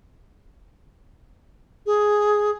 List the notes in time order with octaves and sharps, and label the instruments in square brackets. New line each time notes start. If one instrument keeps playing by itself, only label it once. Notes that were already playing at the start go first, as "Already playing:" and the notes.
[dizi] G#4